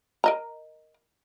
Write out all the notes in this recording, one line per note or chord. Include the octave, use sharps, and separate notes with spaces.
A#4 D#5 A#5